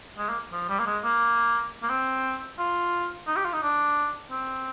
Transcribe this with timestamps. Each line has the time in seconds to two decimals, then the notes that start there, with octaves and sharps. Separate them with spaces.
0.18 G#3
0.29 A#3
0.52 F3
0.69 G3
0.79 A#3
0.87 G#3
1.04 A#3
1.83 A#3
1.90 C4
2.59 F4
3.27 D#4
3.36 G4
3.45 F4
3.53 D#4
3.63 D4
4.31 C4